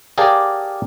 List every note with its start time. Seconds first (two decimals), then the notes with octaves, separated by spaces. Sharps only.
0.18 G4 G#4 A#4 D5 F5 A5